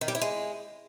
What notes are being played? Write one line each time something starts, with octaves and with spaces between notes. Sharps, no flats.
D#3
G3
E4
G#3